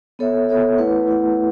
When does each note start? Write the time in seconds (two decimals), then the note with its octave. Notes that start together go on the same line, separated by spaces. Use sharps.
0.19 B3 A4 C#5 E5
0.49 B3 A4 C#5 E5
0.78 A3 E4 B4 F#5
1.07 A3 E4 B4 F#5